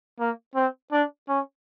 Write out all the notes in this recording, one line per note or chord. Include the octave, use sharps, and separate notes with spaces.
A#3
C4
D4
C#4